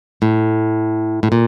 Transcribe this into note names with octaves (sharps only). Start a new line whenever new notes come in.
A2
A2
A#2